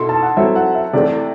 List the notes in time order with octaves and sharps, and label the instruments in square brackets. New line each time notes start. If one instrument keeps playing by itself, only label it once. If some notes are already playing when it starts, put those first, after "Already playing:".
Already playing: [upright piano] B2 E4 A4 [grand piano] C6
[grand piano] A5
F#5
[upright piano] F#3 C4 E4 A4 [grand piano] E5
[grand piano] F#5
E5
[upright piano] C3 E3 A3 [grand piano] D5